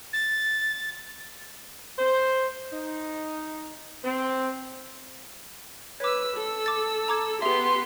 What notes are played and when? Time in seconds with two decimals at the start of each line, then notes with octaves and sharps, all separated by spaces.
0.13 A6
1.99 C5
2.72 D#4
4.04 C4
6.00 B4 C#5 D6 E6
6.36 A4 E6
6.66 D6 A6
7.08 A#5 D6 G#6
7.42 B3 G4 G#4 E5 C6